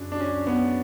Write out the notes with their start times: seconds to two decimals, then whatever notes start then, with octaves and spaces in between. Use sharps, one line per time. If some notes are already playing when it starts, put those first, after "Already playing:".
Already playing: F#2 C#3 F#3 D4
0.12 D4
0.20 C#4
0.47 B3